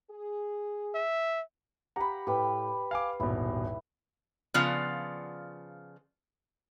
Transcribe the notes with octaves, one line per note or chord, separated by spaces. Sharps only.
G#4
E5
G4 F#5 A#5 B5
A2 G4 B4
F5 G#5 D6
D#1 G#1 B2 E4
C#3 F3 B3 F4 D5 F#5